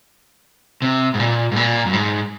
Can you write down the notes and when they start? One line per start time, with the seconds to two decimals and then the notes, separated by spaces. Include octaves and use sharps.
0.82 C3
1.14 G#2
1.20 A#2
1.52 G#2
1.56 A#2
1.86 F#2
1.93 G#2